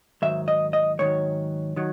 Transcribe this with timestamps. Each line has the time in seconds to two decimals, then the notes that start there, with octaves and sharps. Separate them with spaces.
0.22 G#2 D#3 F#3 E5
0.48 D#5
0.73 D#5
0.99 G#2 D#3 F#3 C#5
1.76 D#3 F#3